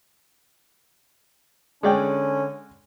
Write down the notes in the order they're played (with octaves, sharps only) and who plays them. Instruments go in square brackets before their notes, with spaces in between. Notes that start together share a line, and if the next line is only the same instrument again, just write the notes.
[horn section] D3 C#4 [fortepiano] G#3 D5 G5